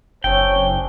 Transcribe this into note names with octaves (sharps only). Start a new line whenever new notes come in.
F#1 C4 D4 G#4 C#5 G5